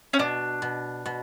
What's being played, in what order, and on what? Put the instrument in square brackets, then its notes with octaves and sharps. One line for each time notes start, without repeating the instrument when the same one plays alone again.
[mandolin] C#4
[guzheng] B2 [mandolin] D4
[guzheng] B2
B2